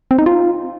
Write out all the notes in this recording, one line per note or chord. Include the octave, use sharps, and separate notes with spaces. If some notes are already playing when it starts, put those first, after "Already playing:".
C4
D#4
F4